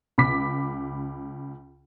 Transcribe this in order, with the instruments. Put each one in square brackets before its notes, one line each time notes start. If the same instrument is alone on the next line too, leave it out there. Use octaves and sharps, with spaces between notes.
[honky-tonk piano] C#2 B5 D6 B6